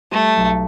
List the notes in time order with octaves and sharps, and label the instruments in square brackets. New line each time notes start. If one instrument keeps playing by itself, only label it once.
[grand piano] G3 [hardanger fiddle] A3
[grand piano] B1